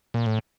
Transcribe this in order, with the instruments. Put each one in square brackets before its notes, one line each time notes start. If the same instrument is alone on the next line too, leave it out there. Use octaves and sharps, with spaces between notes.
[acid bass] A#2
A2